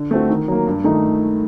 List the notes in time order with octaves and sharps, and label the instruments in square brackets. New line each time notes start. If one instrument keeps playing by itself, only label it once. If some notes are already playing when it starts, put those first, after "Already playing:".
Already playing: [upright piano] D3
A3 C4 F#4
D#3
F#3 A#3
G2
D#3 A3 D#4